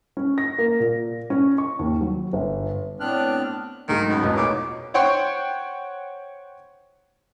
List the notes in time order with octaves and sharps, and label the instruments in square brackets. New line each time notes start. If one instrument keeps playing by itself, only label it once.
[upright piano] C#4
A#6
A#3
A#2
C#4
C#6
D#2
F#3
G1
[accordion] A2 B3 C4 D4 F6 F#6
[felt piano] B1 G#2 G#3 [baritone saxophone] D#3 [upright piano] A3
[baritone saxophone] F#2 [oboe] B3
[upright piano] E1 A1 E2 [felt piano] B2 D#4
[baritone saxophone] A#2 [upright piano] C#5 [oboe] D6
[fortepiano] C5 C#5 F#5 G5 C6 C#6